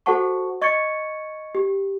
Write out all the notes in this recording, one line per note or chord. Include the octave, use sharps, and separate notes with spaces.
F#4 A4 C5 F#5 A5 C#6
D#5 C#6 G#6 A6 C#7
G4